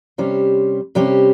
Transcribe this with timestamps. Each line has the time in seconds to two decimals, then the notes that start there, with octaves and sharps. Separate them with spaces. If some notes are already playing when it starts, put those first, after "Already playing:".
0.18 C3 G3 C#4 G4 C5
0.95 C3 G3 C#4 G4 C5